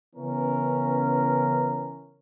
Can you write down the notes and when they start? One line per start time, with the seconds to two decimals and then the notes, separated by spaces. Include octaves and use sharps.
0.16 C#3 E3 B3 C#4 A#4